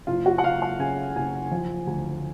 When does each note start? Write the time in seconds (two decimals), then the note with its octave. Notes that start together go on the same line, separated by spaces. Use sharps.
0.07 F#1 F4
0.26 F#4
0.38 F#5
0.44 F#1 F5
0.62 F#5
0.79 C#3 G#5
1.16 F#1 G#5
1.51 F3
1.87 D2